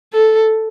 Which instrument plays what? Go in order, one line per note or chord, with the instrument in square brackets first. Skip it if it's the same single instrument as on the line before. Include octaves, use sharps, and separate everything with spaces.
[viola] A4